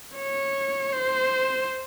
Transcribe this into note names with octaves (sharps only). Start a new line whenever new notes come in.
C#5
C5